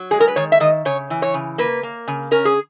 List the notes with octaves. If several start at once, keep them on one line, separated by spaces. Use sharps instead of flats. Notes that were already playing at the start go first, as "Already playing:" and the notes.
Already playing: F#3
G#3 G#4
A#4
B4
D#3 C#5
E5
D#3 D#5
C#3 C#5
E3
C#5
C#3
A#3 B4
A#3
C#3
C#4 A#4
G#4